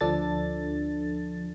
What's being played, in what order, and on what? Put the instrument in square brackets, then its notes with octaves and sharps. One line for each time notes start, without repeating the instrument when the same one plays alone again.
[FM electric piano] D2 F3 D4 A4 A6